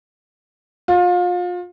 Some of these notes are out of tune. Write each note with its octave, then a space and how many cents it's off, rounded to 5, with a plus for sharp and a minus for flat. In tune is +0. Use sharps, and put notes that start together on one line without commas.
F4 +30